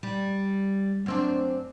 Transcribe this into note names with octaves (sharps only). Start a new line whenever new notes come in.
G3
F#2 C4 D4